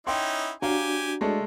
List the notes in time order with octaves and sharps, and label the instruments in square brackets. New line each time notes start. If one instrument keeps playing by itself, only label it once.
[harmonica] C#4 D#4 E4 [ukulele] F#5 G5 [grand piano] C6
[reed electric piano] D4 F#4 [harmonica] G4 G#5 [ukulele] C#5 F5 [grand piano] A#5
[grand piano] G#3 A3 A4 [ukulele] C#5 D5